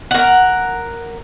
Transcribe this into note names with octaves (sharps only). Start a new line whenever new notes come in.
A#4 F#5